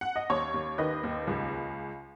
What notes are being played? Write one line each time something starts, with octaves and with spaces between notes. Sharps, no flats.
F#5
D#5
D#2 C#5
D#2
D#3 B4 D#5
D#2
C#2